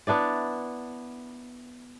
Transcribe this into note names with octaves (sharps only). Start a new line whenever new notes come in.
B3 D4 E4 D5